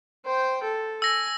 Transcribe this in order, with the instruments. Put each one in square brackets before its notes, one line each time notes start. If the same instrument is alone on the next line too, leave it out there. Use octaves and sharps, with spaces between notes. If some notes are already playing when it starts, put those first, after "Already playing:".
[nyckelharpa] C5 G5
A4
[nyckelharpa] G#5 [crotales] E6 A#6